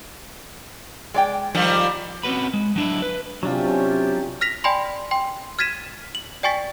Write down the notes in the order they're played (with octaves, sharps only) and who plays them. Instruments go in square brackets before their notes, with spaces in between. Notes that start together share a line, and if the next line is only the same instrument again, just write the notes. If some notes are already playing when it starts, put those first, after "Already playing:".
[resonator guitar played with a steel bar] G#3 D5 G5
[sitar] D#3 F3 G3
[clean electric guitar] C4 C#4 F#4 B4 B5
G#3
F#3 D4 E4
B4
[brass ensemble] C3 C#4 G4 [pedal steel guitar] F#3 D4 F4
[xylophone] F6 A#6 B6 F7
D5 G5 G#5 B5 C6
G5 C6
F6 G#6 A6 B6 D#7 E7
F#7
D5 G5 G#5 C#6 A6 B6